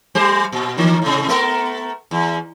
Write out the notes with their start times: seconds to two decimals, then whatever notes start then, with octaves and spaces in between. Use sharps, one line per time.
0.15 G3 G4 C5
0.52 A#2
0.78 D#3 E3 A#3
1.02 A2 C3
1.28 A3 B3 A#4
2.11 E2